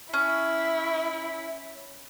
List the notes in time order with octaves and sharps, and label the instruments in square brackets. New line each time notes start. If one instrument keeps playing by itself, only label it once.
[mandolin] C#4 [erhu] E4